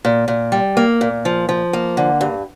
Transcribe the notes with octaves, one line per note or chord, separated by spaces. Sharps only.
A#2
A#2
G3
A#3
A#2
F3
F3
A#3
D3
G2